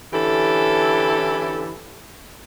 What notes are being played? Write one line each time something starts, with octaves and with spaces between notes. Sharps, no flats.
D3 E3 C#4 E4 G4 A4